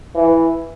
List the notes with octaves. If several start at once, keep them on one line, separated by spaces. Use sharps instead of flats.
E3